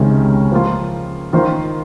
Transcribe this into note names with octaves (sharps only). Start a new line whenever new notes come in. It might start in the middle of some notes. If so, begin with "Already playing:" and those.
Already playing: C#2 C3 D#3 G#3 C#4
F3 A#3 F4
D#3 A#3 F4 C5